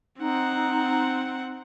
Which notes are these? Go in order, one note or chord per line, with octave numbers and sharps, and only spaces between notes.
C4 D#4 F#5